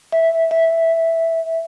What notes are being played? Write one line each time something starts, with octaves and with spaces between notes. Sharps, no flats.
E5
E5